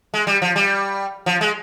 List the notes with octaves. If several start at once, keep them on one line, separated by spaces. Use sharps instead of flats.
G#3
G3
F3
G3
F3
G#3